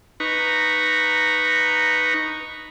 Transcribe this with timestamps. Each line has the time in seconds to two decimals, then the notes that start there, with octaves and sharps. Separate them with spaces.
0.20 D#4 B4 A#5 C#6